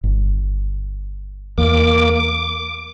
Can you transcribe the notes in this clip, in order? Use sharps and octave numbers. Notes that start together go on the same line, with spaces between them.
G1
E2 A#3 D6
D6